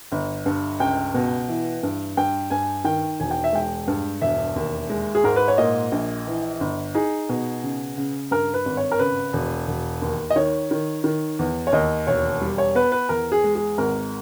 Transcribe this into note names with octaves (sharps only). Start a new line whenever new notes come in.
G1
G2
C#2 G5
B2
E3
G2
G2 G5
G2 G#5
D#3 G5
E1 G#5
G5
E5
G#3 G5
G2
E1 E5
D#2
G#3
G#4
G#2 A#4
B4
C#5
A#2 D#5
A#1
E3
G1
D#4 G#4
B2
C#3
C#3
G2 A#4
B4
G#1
C#5
A#4
C#3 B4
E1
E1
D#2
D#5
D#3 C#5
D#3
D#3
E2
C#5
D#2 D#5
E1 C#5
G3
C#5
B3 B4
B4
E2 A#4
G#4
G#3
G#4
G#1 A#4